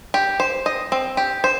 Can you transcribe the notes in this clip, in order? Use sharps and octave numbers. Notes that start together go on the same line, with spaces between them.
G4
C5
D#5
C4
G4
C5